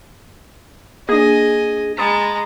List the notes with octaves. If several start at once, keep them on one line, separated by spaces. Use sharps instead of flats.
A#3 D4 G#4 D#5 G#5
G#3 A#5 B5 D#6 A6